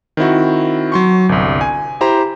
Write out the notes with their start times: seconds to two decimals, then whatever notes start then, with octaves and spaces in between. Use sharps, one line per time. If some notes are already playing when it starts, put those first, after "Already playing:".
0.17 D#3 C4 E4 F#4
0.92 F#3 C6 C#6
1.29 G1 C2
1.61 G#5
2.01 E4 G4 C5 A#5